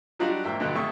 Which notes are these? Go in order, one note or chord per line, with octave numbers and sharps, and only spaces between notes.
F#3 G3 D4 D#4 F4 F#4
E2 G#2 A#3 E5 G5
G2 B2 D3 D#3 F#3
G#1 C3 A3 E5 A5 C#6